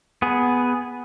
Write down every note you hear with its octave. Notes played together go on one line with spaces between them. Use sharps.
B3 G#4